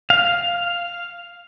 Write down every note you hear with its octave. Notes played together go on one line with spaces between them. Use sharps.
F5